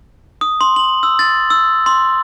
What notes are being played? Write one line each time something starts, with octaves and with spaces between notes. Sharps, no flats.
D#6
C6
F#7
E6
A6
E6
C6